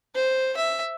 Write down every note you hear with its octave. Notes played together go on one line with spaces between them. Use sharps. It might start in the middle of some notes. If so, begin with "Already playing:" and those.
C5
E5